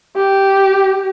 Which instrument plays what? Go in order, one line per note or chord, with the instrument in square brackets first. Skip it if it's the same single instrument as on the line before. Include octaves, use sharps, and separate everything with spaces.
[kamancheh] G4